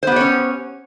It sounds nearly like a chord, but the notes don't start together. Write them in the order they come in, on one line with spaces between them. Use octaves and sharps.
C5 B3 G4 C#5 C#4